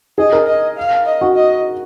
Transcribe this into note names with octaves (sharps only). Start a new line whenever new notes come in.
G#4 D#5
A#4
D#5
F5
D#5
F#4
D#5